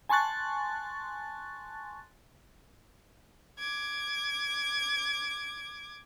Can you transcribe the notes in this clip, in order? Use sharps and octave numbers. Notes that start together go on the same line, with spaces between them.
G#5 A5 C6 C#6 F#6 A6
D6 G#6